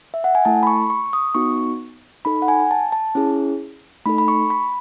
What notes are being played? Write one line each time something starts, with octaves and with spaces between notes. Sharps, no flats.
E5
F#5
G#5
A3 E4 A4 A5
B5
C#6
C#6
D#6
B3 D#4 F#4 C#6
D#4 A4 B5
F#5
G#5
A5
A5
C#4 E4 G#4
A3 D#4 A4 B5
B5
C#6
B5